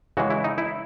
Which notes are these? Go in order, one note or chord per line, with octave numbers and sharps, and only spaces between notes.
C#3 E3 G#3 F#4
E4
D#4
E4